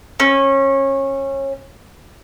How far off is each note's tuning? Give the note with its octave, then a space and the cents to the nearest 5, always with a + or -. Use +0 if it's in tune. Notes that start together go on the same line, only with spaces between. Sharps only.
C#4 -25